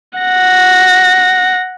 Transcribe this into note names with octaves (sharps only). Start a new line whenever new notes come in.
F#5 A#6